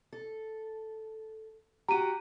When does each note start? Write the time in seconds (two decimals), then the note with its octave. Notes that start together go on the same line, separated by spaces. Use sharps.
0.12 A4
1.88 F#4 G4 A#5 D#7